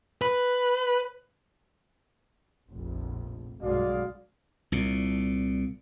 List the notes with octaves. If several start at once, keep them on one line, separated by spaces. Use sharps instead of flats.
B4
F1 A#1
B1 G2 G#3 F#4 D5 F5
C2 A#2